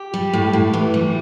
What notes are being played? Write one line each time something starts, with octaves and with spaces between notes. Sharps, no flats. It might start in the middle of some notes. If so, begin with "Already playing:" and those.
Already playing: G4
G3
A2
A2
E3
G3